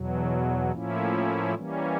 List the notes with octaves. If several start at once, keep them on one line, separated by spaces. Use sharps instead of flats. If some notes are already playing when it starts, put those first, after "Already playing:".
Already playing: E2 B2 F#3
A2 F3 A#3 C#4 E4
E3 G3 A#3 C#4